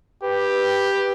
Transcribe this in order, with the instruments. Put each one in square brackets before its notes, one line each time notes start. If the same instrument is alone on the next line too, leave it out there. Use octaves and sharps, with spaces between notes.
[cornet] G4 [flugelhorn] B4